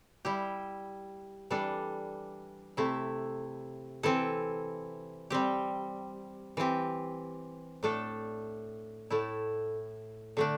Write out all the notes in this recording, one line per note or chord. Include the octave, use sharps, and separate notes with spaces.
G3 E4 G4
E3 G3 D4 A4
C3 A3 E4
E3 C4 E4 A4
G3 C4 G4
E3 C4 G4
A2 A3 D4 A4
A2 A3 E4
D3 A3 D4